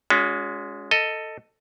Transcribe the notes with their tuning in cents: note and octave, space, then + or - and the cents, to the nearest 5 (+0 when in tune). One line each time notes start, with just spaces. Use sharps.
G#3 +0 C#4 +30 F#4 -40
A4 +15 D#5 +0